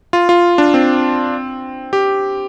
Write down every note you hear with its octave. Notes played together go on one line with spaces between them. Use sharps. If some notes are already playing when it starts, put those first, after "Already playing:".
F4
F4
D4
C4
G4